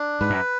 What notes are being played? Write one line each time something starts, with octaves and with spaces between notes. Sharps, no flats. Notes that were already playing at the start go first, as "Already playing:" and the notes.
Already playing: D4
G#2 B4
F#2